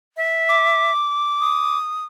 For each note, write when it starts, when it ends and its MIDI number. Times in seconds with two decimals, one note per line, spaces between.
0.17 0.92 76
0.49 1.78 86
1.41 2.05 87